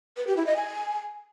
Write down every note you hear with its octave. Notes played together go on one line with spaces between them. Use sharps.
B4
G4
E4
D#5
G#5